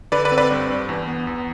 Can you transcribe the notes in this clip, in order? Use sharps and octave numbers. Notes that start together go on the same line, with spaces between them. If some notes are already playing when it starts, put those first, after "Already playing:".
D3 B4 D5
B4 D5
C4
B4 D5
G2
G2
E2
B3
E2